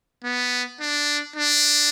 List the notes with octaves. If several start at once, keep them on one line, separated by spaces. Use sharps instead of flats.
B3
D4
D4